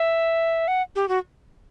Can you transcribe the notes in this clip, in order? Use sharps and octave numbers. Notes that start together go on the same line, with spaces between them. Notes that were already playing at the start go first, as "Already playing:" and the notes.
Already playing: E5
F#5
G4
F#4